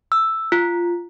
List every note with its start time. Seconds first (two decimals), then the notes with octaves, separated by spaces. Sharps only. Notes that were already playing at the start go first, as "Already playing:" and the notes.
0.12 E6
0.52 F4